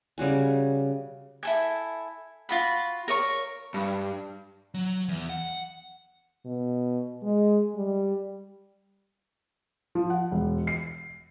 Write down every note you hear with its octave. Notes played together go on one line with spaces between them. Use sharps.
C#3 G3 F#4 G#5
E4 A4 G#5
F4 F#4 B5
A#4 C#5 C#6
G2
F#3
E2
F#5
B2
G#3
G3
F3
F#5
E1
C7